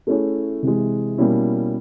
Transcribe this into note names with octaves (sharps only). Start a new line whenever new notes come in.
A3 C#4 E4 G#4 C#5
C3 E3 G#3
B2 G3 A#3 C#4 E4